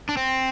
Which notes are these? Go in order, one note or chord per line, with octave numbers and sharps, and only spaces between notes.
D4
C4